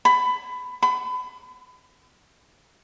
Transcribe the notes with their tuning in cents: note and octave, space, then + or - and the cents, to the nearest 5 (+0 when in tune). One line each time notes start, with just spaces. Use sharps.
B5 +20
B5 +35